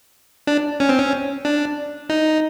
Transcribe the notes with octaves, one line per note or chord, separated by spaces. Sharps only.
D4
C#4
C4
C#4
D4
D#4